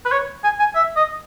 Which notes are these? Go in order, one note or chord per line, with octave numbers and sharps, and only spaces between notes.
B4
C#5
G#5
G#5
E5
D#5